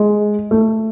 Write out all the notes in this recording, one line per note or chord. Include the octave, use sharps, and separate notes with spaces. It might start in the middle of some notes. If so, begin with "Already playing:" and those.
Already playing: G#3
A3